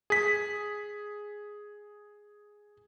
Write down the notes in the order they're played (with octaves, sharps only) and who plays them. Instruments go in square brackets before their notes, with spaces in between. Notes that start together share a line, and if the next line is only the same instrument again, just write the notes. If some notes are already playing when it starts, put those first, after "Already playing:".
[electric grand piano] G#4 B6